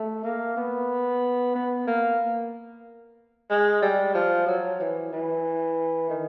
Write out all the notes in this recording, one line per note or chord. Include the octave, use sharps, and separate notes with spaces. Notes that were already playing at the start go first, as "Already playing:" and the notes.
Already playing: A3
A#3
B3
B3
A#3
G#3
G3
F3
F#3
E3
E3
D#3